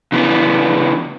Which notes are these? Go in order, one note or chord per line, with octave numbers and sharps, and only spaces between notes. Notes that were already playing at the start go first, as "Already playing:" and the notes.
C#3 E3 B3 D4